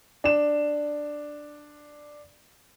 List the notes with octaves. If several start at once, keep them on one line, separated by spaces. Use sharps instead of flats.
D4 E7